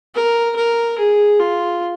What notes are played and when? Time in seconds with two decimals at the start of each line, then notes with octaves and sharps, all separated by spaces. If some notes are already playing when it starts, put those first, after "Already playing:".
0.15 A#4
0.56 A#4
0.98 G#4
1.39 F4